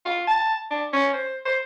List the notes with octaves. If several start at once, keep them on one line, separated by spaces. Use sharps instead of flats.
F4
A5
D4
C#4
C5
C5